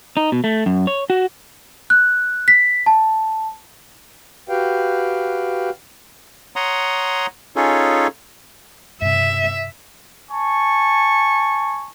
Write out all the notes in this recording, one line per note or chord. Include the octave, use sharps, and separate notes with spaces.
D#4
B2
A3
F#2
C#5
F#4
F#6
B6
A5
F#4 G4 B4 F5 G5
C#5 F#5 A#5 C6 D#6
C#4 D#4 F4 G#4 A4 C#5
G2 C3 E5
G#5 A5 C#6